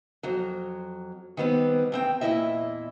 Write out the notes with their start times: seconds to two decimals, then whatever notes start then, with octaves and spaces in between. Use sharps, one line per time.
0.23 F2 F#3
1.37 D#3 G3 B3 C4
1.92 E2 C4 G5
2.21 E2 A#2 C#3 E4 D#5 E5